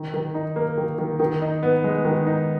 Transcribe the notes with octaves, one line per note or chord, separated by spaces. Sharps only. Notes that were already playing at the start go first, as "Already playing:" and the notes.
Already playing: D#3
D#3
D#4
A#3
D#3
D#3
D#3
D#4
B3
G#3
D#3
D#4